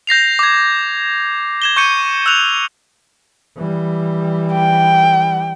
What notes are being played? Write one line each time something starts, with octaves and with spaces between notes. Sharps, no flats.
G6 A#6 C7 F7
D6 G#6
G#6 E7 G7
C#6 G6 C#7 D#7
E6 F#6 F7
E3 G3
G5